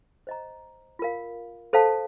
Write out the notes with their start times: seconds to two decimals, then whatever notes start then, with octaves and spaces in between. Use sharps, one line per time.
0.27 C5 D#5 A#5
0.99 F4 A#4 F5
1.73 A4 C5 F5 A5